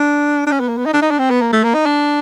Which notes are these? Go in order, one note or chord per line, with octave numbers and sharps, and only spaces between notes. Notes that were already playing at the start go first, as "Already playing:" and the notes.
Already playing: D4
D4
C#4
B3
A#3
B3
D#4
D4
D#4
D4
C4
B3
A#3
A3
A#3
D#4
D4